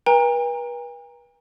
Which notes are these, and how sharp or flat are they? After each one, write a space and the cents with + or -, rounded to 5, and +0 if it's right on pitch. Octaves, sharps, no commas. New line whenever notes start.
B4 -40 G5 +45 A#5 +0